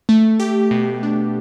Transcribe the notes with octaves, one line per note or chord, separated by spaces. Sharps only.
A3
G4
B2
D4